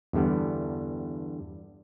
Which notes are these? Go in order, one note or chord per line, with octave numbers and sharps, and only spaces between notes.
E2 G2 D3 G3 B3